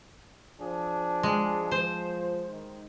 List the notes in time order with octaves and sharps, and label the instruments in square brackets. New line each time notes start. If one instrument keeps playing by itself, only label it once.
[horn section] F3 D4 G#4
[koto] G#3
[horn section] F3 [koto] C5
[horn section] D#3